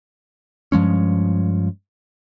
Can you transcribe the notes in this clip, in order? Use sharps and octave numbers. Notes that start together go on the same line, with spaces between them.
G2 F3 G#3 C#4